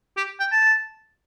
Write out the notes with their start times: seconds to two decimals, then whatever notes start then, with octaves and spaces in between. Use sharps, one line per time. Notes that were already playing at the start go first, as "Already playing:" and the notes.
0.17 G4
0.40 G5
0.52 A5